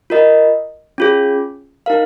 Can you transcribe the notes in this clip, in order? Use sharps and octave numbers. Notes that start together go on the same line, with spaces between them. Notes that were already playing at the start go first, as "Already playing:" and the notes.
F4 A#4 D#5
C#4 F4 G#4
D#4 A#4 F5